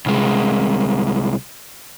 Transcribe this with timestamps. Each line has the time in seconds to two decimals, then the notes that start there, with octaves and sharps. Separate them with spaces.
0.06 C2 G#3